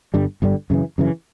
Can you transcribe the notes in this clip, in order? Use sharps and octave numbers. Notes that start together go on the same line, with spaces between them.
G1 G2 D3 G3
G1 G2 D3 G3
F#2 C#3 E3
F#2 C#3 E3